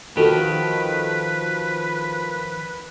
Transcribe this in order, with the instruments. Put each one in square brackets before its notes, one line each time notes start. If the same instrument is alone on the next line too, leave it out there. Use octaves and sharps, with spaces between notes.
[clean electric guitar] D#3 G4 [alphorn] F3 [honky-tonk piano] F#4 A4 [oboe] B4